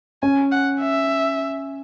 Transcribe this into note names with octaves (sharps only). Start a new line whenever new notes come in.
C#4 G#5
F#5
E5